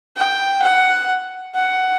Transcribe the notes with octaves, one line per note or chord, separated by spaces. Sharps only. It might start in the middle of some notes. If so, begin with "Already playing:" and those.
G5
F#5
F#5